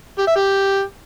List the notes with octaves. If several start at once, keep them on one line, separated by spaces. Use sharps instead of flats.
G4
E5
G4